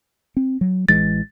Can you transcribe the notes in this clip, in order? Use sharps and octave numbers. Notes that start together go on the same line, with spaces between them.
C4
F#3
A1 E3 G#3 A6